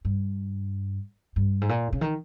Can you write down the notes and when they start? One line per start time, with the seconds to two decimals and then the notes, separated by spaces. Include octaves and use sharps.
0.05 G2
1.36 G2
1.61 G#2
1.69 A#2
1.93 C#3
2.01 D#3